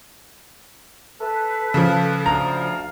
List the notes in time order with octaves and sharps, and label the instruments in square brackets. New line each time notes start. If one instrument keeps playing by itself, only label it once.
[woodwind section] A4 B4
[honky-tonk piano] C#3 F3
[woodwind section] D2 F5 [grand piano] A#5